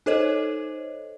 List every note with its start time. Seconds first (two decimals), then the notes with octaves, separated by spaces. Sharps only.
0.06 D#4 A4 C5 C#5 D#5